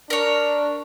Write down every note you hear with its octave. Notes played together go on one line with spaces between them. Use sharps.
D4 A#4 C#5